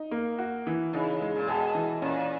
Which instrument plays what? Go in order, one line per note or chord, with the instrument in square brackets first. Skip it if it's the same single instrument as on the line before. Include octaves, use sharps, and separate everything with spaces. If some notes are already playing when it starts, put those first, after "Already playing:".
Already playing: [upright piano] D#4
A#3
F#4
E3
[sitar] C#3 [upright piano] D#4
[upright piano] G#3
[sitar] A#2
[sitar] B2 [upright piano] G#4
[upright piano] E3
[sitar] A#2 [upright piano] C#4